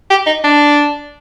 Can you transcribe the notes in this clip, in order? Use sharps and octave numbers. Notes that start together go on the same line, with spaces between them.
G4
D#4
D4